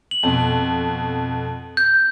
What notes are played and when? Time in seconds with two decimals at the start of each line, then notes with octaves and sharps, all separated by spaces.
0.11 F#7
0.23 F2 B2
1.77 G6